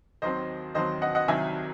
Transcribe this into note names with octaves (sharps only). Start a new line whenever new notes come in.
D#2 D#3 F#3 C4 C5 D#5
D#2 D#3 F#3 C4 C5 D#5
D#5 F#5
D#5 F#5
C2 C3 D#3 F#3 E5 G#5